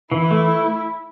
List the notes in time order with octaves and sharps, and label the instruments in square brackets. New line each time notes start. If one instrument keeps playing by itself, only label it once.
[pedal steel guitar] E3 [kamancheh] E4
[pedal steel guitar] A3